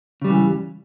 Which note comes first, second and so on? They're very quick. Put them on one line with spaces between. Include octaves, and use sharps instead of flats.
C#3 G3 G2 E3